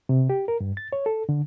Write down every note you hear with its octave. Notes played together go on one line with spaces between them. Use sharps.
C3
G4
A#4
G2
A6
C#5
A4
D3